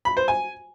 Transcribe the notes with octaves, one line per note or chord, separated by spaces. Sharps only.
B5
C5
G#5